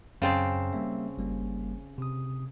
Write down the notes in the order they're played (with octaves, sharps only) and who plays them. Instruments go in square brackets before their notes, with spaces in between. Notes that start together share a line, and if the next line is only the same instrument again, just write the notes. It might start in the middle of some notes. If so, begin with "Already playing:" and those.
[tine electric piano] F#2 [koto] C#3 C4 A5
[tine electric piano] G3 A#3 E5
G1 G3 A#3
C3 D#6